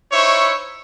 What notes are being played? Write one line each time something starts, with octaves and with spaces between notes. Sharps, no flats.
D#4 E4 C5 C#5 E5 C#6